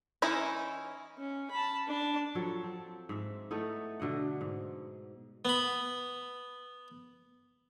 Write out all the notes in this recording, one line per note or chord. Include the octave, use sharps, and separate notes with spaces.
E3 C#4 D#4 E4
C#4
A5 B5
D4 A5
F3 F#3 A4 C#5
C4
G#2 E5
A3 B3 D#4 E4
B2 D3 D#5 F#5
G#2
B3 B5